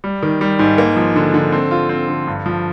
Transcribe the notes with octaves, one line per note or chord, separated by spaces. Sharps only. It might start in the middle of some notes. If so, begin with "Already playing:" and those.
G3
D#3
G3
G#2
A#3
F3
D3
D3
C4
F4
C4
D3
G2
F3